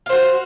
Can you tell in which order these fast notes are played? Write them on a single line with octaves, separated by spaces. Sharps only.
F5 C5 F#4